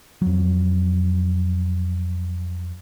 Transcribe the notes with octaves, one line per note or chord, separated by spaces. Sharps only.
F2 F#3